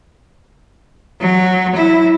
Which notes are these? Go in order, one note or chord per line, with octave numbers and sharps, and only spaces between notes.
F#3
E4